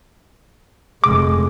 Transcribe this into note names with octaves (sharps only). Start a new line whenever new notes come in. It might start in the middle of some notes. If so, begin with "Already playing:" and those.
F1 G#3 D6